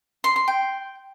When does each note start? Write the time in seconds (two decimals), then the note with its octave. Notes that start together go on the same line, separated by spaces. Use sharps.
0.24 C6
0.36 C6
0.48 G5